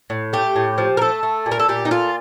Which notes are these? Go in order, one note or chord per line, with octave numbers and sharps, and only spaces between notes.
A2
A3 G4
A2
F3
A#4
A3 A4
A3
A#2
A#4
A4
A#2 G4
D#4
A3 F4